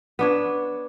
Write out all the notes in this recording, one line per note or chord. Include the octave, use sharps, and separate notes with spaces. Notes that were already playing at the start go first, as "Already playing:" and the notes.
B3 D4 C#5